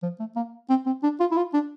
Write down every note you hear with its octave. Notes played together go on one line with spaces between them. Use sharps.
F3
A3
A#3
C4
C4
D4
F4
E4
F4
D4